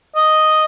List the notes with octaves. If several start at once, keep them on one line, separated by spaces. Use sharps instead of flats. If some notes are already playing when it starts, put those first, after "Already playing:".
D#5